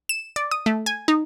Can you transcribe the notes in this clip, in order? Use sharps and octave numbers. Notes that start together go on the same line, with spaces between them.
E7
D5
D#6
A3
G#5
D#4